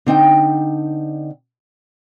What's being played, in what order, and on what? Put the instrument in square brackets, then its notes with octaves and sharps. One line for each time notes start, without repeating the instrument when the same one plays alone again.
[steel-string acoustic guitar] D3 C4 D#4 G5